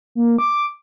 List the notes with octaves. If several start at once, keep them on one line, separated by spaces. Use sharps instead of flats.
A#3
D6